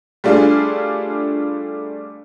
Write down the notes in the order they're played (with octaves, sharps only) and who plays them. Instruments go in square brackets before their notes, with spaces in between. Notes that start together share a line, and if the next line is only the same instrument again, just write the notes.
[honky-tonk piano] G3 A3 D4 F4 G#4